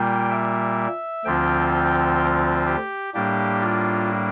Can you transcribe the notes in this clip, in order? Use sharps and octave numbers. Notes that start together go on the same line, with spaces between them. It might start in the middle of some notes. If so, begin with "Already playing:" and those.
Already playing: A#2 G3 A#3 G5
E5
D2 D3 F3 C4 F4 G5
G4
A2 G3 A#3 D4 G4
F4